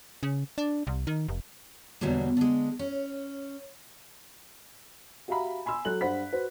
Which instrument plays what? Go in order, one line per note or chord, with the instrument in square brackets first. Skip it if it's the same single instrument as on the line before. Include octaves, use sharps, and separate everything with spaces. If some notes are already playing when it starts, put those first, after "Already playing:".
[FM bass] C#3
D4
C2
D#3
F1
[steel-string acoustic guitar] E2 B2 D3 F#3 G3 A#3
D3 G#3
C#4
[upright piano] F#4 G4 E5 F5 A#5 B5
G#5 B5 C6 E6
F#3 A4 F#6 F#7
G2 C5 F#5 B5 B6
F#4 B4 C5